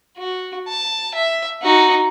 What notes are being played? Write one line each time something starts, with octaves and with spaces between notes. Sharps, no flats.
F#4
A5
E5
D#4 F#4